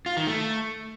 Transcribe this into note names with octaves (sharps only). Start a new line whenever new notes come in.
F4
D#3
A3